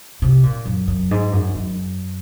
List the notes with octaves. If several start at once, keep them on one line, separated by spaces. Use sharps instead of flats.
C3
A#2
F#2
F#2
G#2
F#2
F#2